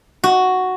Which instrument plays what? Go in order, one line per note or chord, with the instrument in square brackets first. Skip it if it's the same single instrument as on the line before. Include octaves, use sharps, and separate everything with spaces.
[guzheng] F#4